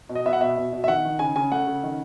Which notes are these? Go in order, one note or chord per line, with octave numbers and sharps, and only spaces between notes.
B2
D#5
B3 E5
F#5
B2 E5
B2
B2
E5
D#3 F#5
D#3
C#3 G#5
C#3 G#5
A3 F#5
C#3
D#3